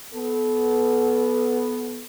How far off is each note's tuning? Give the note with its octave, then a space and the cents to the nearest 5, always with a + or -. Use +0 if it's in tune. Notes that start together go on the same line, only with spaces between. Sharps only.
B3 +0 A4 -30